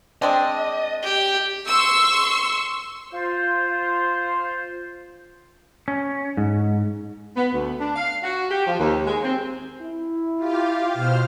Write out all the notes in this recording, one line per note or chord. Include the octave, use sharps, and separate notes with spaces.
G#3 C4 D4 D#5
G4
C6 C#6 E6
F4 C5
C#4
G#2
B3
D2
D4
F5
F#4
G4
F3
D#2
G#3
C4
E4
F4 G4 F5
B2 C5 F6